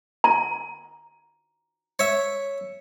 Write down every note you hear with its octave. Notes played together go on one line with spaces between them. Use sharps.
A#5
C#5 E5